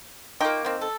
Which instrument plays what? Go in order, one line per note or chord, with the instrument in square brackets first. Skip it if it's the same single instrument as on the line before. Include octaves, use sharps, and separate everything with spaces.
[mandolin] A#3 C#6 D6 [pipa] D#4 F4 G5
[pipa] D#3 C4
[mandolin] A4